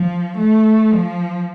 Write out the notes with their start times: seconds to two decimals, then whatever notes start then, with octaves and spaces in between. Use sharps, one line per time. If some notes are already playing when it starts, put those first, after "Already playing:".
Already playing: F3
0.37 A3
0.91 F3